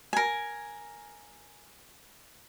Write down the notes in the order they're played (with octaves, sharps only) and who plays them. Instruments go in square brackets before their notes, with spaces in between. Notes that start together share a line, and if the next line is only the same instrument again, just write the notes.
[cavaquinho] A#4 G#5